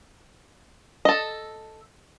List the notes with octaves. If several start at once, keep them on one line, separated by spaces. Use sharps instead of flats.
A4 D#5